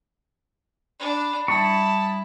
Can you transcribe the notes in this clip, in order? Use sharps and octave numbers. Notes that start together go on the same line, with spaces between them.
D4 B5
G3 E4 A5 C#6 D#6